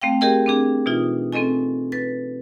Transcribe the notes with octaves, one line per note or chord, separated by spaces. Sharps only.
A3 C4 F5 G5
G4 G#4 A#4 D#5 G5
C4 D4 G#4
B2 E3 D#4 F4
C4 C#4 A4 D#5 G#5
B4 A6